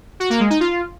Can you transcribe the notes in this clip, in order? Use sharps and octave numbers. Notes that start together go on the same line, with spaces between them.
F#4
A#3
G#3
D#4
F4